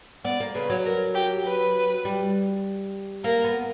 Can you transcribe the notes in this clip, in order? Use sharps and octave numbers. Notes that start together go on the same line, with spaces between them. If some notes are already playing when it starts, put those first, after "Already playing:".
B3 D5
A#3
C#3 B4
F#3
A#4
G4
B4
G3
A#3 A#4
B3